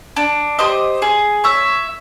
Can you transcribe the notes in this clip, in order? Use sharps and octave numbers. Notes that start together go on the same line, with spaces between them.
D4
G4 C5 D#5
G#4
C#5 E5